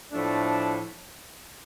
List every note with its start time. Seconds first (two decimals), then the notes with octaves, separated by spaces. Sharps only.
0.12 A2 F3 A3 D4